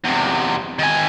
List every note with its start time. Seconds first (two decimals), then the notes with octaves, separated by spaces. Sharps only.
0.04 E2 C3
0.79 D#3 G#5